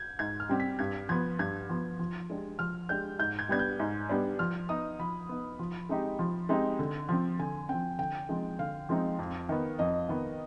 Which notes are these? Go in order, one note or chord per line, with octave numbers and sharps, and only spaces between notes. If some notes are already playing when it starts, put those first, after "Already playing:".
Already playing: G6 G#6
G#2 G#6
F6
G3 C4 G4
B6
G2 G#6
F3 B3 G#6
G2 G#6
F3 B3
F3
G#3 D4 G4
F3 F6
G#3 D4 G4 G6
G#2 G6
G#6
G3 B3 D4 G#6
G6
G#2
G3 B3 D4
F3 F6
B3 D#4 D#6
F3 B5
B3 D#4
F3
G#3 C4 D#4 G4
F3
G#3 C4 D#4 G4
D3
F3 C4
D3 G#5
F3 C4 G5
D3 G5
F3 G#3 C4 D#4
D3 F5
F3 G#3 C4 D#4
F2
D#3 B3
F2 D#5
D#3 B3